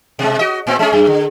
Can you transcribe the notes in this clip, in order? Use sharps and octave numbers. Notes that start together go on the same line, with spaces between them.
B2 G#3
F#4 D#5
A2 B3 C4
G#3 C#4 G#4
F#2
D3